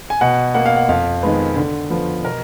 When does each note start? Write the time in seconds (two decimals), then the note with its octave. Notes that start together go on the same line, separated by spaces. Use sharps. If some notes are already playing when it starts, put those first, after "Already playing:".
0.10 G#5
0.21 B2 F#5
0.54 A#3 F#5
0.66 F5
0.77 F#5
0.89 F2 F5
1.23 D#3 G#3 B3
1.57 D3
1.90 F3 B3
2.24 B2 A#4